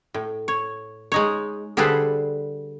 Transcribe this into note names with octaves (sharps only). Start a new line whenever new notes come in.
A2
C#5
G#3 D#4 C#5
D3 G3 G#4 A4 B4 C5